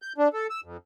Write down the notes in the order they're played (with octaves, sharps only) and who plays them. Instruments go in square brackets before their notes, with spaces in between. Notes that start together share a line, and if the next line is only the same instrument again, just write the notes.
[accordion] G6
D4
A4
E6
F2